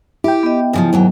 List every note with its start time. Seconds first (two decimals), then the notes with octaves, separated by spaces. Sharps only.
0.24 E4 G4 G5
0.43 B3 D#5
0.73 C#3 E3 F3
0.93 D#2 G#2 F#3